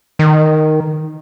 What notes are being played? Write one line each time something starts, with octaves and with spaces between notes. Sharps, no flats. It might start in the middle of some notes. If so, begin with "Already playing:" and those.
D#3